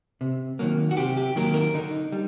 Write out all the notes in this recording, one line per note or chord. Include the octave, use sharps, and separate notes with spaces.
C3
D#3 F#3 A#3
F#4
C3 G4
G4
D#3 F#3 A#3 A#4
A#4
D3 D#4
G3